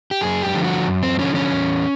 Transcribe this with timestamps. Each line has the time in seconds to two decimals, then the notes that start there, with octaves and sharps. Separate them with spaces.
0.11 G4
0.21 F#2 G#4
0.42 G4
0.54 D3 F3
0.64 F#4
0.87 F#2
1.03 C4
1.19 D3 F3 C#4
1.35 C#4
1.52 E2